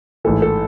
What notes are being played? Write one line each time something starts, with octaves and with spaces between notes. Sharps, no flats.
A1 G#2 E3 A4
A4